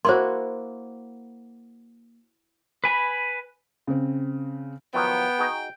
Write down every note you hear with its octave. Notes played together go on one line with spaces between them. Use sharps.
A#3 E4 F#4 C5 C6
B4 G#5 B5
C#3 C4
D#3 F3 F#3 B3 G5
D#4 F#4 G#4